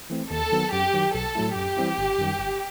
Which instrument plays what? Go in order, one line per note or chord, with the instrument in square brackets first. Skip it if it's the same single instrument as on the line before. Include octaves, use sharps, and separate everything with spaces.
[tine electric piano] E3 A3 C4
[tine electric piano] D#2 [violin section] A4
[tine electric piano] D#3 F#3 B3
[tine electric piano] F#2 [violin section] G4
[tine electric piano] D#3 F#3
[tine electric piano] B1 [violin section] A4
[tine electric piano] A2 F#3 A3 E4
[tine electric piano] F#2 [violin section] G4
[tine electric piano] E3 G3 C4 E4
G1
F#2 D#3 G3
G1